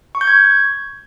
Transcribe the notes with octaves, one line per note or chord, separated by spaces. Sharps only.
C#6
G6
G#6